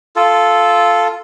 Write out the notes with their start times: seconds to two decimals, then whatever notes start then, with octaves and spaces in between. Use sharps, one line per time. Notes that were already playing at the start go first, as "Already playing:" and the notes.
0.16 F4 A4